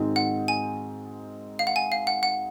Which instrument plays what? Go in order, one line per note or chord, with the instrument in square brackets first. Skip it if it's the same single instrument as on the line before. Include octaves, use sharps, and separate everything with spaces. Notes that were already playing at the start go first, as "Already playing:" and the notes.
Already playing: [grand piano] G#2 D#3 G#3 C4 F#4
[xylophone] F#5
G#5
F5
F#5
G#5
F5
F#5
F#5